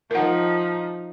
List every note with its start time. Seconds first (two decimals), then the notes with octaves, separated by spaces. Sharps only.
0.11 F3 D#4 A#4 F#5